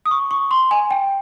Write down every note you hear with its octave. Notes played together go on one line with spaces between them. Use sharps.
D#6
C#6
C#6
C6
G#5
G5